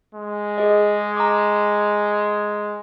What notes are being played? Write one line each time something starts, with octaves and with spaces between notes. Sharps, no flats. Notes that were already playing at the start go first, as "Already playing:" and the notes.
G#3
G#4 D#5
A#5 D6